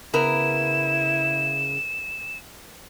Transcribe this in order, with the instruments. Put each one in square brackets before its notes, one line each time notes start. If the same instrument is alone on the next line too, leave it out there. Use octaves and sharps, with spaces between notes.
[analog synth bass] C#3 [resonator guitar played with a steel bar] B3 A#4 [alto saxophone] E4 [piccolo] E7